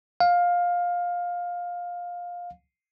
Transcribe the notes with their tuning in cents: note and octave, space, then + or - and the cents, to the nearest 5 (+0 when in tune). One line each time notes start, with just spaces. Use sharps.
F5 +15